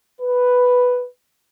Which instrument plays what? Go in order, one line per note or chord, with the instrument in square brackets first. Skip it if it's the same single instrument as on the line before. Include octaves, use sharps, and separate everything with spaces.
[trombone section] B4